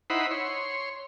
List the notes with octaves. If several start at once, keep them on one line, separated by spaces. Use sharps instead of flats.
D#4 E4 C5 F#5 B5
C#5 C6